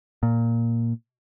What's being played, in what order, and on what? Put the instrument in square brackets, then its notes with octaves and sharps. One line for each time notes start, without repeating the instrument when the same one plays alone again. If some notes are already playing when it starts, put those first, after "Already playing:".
[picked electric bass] A#2